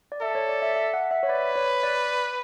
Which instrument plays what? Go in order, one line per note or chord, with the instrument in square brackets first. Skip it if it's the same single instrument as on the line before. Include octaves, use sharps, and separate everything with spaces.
[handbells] D5
[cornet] A4 [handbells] E5
[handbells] C#5
D5
E5
E5
F#5
E5
C#5
[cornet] B4 [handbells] D5
[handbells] C#5
D5